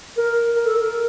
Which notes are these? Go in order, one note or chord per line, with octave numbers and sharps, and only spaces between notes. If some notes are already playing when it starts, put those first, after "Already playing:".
A#4
A#4
A4
A#4